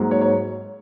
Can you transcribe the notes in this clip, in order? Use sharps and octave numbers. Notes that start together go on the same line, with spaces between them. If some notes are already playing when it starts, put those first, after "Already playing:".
Already playing: G#2 F#3 A#3
C#5
C#5